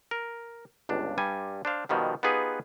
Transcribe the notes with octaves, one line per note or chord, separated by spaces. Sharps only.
A#4
G1 C#2 D4
G2 G3 G#5
D4 C5 F5
B2 D#3 F3 G3
B3 D#4 F4 G4 G#4 B4